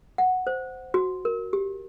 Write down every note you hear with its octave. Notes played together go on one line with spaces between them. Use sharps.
F#5
C5
F#4
A#4
G4